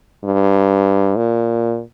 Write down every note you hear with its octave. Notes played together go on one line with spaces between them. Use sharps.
G2
A#2